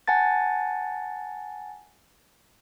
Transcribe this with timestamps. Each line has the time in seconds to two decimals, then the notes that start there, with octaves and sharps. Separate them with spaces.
0.08 F#5 G#5 A5 A6